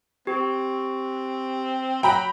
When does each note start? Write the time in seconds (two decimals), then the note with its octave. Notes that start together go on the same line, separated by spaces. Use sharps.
0.27 C4 G4
2.03 F#3 G5 A#5 B5